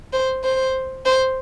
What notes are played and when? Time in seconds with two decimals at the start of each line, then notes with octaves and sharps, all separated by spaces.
0.13 C5
0.44 C5
1.06 C5